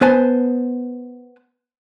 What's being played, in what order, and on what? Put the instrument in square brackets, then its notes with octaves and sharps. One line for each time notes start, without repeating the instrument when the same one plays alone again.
[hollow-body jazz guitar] B3 B4 C5 G#5 A5